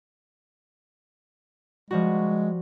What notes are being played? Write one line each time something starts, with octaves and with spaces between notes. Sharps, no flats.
F3 G3 G#3 F#4